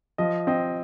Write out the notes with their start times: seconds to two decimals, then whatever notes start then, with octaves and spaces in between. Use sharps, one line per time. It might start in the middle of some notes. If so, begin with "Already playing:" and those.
0.18 F3 D#5
0.47 C4 D#5